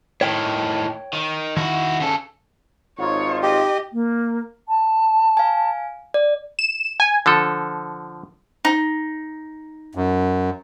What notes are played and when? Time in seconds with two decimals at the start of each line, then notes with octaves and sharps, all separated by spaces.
0.21 A2 D#3 C#5 G5
1.13 D#3
1.57 D#3 E4 F#4
2.00 C#3 A4
2.99 G#1 D#4 F4 C#5
3.43 G4 D#5
3.93 A#3
4.69 A5
5.37 F5 G#5
6.14 D5
6.59 E7
7.00 G#5
7.26 D3 F3 A4
8.65 D#4
9.95 F#2